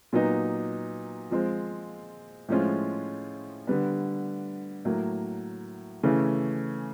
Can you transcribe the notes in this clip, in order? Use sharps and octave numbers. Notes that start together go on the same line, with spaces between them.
A#2 F#3 B3 D#4
F3 G#3 C4 F4
A2 F3 G#3 C#4 F4
D3 G3 B3
A2 F#3 A#3
C#3 E3 A3 C#4